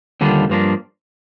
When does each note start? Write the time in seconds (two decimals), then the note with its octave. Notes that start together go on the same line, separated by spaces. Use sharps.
0.21 D#2 D3 G3 D4 F4
0.49 G2 F3 A#3 D4